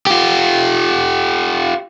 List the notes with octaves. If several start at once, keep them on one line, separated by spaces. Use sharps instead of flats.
F4 G4